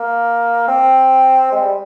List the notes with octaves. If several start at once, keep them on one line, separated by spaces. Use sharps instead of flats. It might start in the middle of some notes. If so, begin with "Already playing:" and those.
Already playing: A#3
C4
G#3
G3